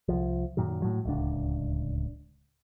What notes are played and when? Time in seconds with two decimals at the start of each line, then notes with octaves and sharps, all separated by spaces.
0.08 C2 F3
0.57 F#2 A#2 D#3 F#3
0.82 A2 F#3
1.05 D1 C#2 D4